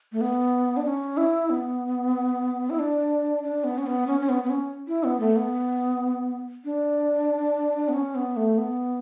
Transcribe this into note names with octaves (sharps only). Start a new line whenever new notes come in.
A3
B3
D4
C#4
E4
B3
E4
D4
D4
B3
C#4
B3
C#4
C#4
B3
B3
C#4
E4
B3
A3
B3
D4
B3
C#4
B3
A3
B3